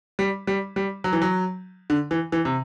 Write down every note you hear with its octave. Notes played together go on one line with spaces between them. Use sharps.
G3
G3
G3
F#3
E3
F#3
D3
E3
E3
C3